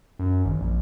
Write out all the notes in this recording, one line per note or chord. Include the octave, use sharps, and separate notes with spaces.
F#2
G#1
A#1